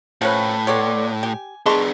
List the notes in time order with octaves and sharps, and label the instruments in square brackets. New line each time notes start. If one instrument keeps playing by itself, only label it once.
[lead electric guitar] A2 [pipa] F3 C#4 [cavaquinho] B4 G#5
[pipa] B3 C#5 [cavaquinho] A4 D5 C6
[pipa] G4 [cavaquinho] G#5
[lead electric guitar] B3 D4 [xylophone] G#4 D#5 A5 [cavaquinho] A#4 C#6 [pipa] C6